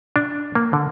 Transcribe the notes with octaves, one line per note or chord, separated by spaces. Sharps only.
D4
A#3
D3